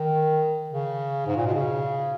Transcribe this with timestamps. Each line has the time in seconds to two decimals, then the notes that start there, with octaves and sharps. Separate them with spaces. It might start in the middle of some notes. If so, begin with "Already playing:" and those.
Already playing: D#3
0.69 C#3
1.27 G#2
1.37 A#2
1.46 B2
1.55 C#3